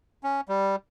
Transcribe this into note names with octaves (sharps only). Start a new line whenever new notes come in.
C#4
G3